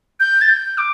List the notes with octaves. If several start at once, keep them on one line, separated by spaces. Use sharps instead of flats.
G6
A6
G6
D6